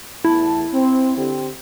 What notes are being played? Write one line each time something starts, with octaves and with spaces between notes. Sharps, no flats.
E2 A3 E4 A5
C4
D3 C4 G4